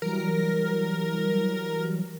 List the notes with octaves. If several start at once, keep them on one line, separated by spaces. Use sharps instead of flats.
E3 F#3 G3 A#4